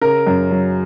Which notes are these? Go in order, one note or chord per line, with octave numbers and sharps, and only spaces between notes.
C#3 A#4
F#2
F#3